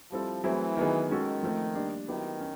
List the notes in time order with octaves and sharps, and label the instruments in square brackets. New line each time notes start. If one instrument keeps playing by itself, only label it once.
[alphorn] F3 [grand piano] G3 C4 E4 A4
[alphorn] E3 [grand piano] F#3 A3 C4 E4 G#4
[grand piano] D#3 F#3 B3 D#4 G#4
[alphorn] D#3 [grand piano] G#3 C#4 F#4 A4
[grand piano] F3 A3 C4
G3 A#3 D4
[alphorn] D#3 [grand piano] F#3 B3 E4 G4
[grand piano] C#4